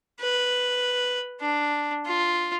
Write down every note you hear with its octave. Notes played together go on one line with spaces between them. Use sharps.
B4
D4
F4